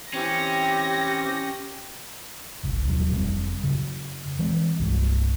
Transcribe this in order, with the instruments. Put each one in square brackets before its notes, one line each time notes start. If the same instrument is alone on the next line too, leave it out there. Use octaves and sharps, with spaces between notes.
[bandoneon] E3 C4 [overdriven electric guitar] C#4 [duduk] G4 [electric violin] A#6
[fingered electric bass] F#1 C2
D#1 B1 F3 F#3
F1 G3 C4
F#2 C#3
E3 G#3 C4
C2 G2 G#3